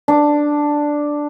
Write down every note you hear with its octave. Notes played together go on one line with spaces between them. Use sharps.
D4